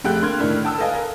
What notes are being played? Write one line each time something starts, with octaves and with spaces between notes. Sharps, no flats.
F1 A3 G4 G#4 G5 F#6
D3 A#3 C6 F6 G#6
A2 D3 D#3 A3 D4 E4
G5 A5 D#6 E6
A4 B4 D#5 F5 G#5
A#4